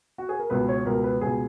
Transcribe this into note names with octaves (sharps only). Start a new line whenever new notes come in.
F#4
G#4
A#4
C#2 B2 B4
C#5
C#2 B2 A#4
B4
C#2 B2 G#4